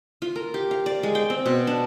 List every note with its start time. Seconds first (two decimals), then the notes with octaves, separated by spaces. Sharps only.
0.22 F4
0.36 A#4
0.54 G4
0.71 F5
0.86 D5
1.03 G#3
1.15 G5
1.30 C4
1.46 B2
1.67 D4